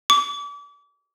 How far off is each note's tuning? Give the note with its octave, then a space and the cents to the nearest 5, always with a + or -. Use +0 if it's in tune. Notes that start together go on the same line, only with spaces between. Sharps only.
D6 -35